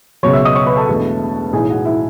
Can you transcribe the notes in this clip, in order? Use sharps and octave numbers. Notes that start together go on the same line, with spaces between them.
C#2 B2 F#3 C#5 C#6
E5 E6
D#5 D#6
C#5 C#6
B4 B5
A4 A5
E1 E2 B2 A3
B1 A2 E3 G#4 G#5
F#4 F#5
E4 E5